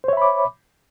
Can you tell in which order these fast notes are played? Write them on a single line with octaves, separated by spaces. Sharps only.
C5 C#5 E5 B5 D6